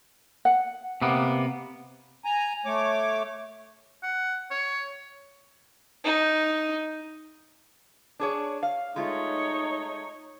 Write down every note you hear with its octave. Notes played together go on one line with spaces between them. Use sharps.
F#5
C3 A#3 B3
G#5 A#5
A3 C#5 D6
F#5
C#5
D#4
D4 G#4 C#5
F5
G#3 A3 D#4 F4 C#5